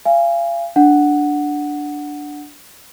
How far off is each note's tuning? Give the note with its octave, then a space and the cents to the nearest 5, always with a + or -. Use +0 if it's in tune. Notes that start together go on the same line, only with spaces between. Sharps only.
F5 -35 G#5 -20
D4 +0 F#5 +0